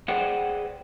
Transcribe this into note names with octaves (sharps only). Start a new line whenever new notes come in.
G#4 B4 C5 D5 F#5 G5